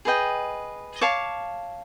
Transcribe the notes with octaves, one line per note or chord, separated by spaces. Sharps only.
G#4 B4 D#5 G5
C#5 F5 A5 D6